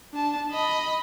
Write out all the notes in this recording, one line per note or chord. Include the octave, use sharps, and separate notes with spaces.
D4 A5
D#5 B5